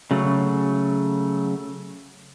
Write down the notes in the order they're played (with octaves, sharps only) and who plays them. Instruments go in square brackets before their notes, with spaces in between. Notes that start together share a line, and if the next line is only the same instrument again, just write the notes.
[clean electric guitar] C#3 F#3 A3